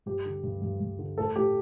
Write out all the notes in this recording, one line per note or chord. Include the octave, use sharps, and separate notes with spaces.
G2 G4
D3
G2
G2
G2
D3
A2 A4
A2 G4